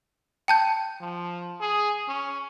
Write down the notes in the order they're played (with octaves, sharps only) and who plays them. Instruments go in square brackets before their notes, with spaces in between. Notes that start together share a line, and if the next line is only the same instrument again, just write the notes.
[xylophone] G5 A5 G6
[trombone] F3
G#4
C#4